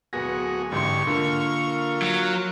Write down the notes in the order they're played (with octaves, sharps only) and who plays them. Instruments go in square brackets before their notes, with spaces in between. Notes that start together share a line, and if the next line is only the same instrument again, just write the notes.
[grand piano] D1 B3 A#6 [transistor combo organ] F#4 G#4
[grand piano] A1 C6 [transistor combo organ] G#2 D3 G4 [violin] C#6
[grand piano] D3 A#3 A#5 [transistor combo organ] F4 A#4
[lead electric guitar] F#3